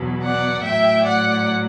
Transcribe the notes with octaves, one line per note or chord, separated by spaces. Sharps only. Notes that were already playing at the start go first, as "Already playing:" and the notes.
Already playing: E2 B2 F#3
D5 F#5
A2 F#3 E5 G5
D5 F#5